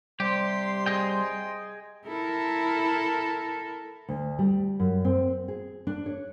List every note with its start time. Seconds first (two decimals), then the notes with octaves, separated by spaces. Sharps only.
0.20 C3 G3 G4 C6
0.86 G#4 D#5 G5
2.06 E4 A4 A#4
4.09 D2
4.39 G3
4.80 F#2
5.05 C4
5.48 G#4
5.87 D4
6.06 C#5